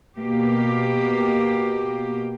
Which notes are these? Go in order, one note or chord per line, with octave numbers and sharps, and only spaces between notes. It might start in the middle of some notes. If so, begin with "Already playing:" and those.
B2 A#3 G4